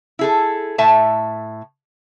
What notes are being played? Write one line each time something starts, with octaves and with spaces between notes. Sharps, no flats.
E4 G#4 A4
A2 E5 A5